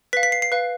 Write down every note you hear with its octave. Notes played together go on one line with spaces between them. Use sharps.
B4 F5 B6
B6
C7
C7
B4 F5